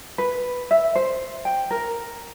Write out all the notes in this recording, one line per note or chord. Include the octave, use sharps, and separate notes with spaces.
B4
E5
C5
G5
A#4